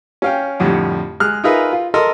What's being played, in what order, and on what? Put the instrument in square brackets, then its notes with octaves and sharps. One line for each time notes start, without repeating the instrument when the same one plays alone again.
[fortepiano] C#4 F5 G5
F2 A2 D3 G3
G#3 F6 F#6
D#4 F4 G#4 A#4 B4 E5
F4
A4 A#4 D#5 C6